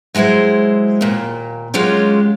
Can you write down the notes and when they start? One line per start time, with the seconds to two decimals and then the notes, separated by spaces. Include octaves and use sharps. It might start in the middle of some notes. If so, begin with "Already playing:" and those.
0.15 F#3 G#3 E4 G#4 C5
1.01 D#2 A#2
1.74 F#3 G#3 C#4 F4 G4